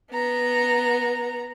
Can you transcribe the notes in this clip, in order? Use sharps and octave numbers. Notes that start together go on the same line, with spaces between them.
B3 A#5